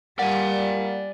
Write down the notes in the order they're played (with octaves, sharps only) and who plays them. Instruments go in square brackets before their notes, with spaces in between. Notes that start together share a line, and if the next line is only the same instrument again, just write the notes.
[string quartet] G3 [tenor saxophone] A#3 [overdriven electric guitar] D5 G#5 [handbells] F#5